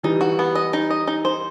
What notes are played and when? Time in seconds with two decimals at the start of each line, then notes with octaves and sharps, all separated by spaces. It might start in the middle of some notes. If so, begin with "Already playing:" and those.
0.03 E3 G3 D#4
0.21 F#4
0.39 B3
0.55 D#5
0.73 D#4
0.90 D#5
1.07 D#4
1.25 C5